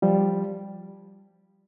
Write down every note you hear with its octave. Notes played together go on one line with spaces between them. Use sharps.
F3 G3